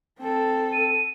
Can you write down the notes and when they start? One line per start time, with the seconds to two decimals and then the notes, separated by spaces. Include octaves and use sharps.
0.19 C4 A4
0.72 D#7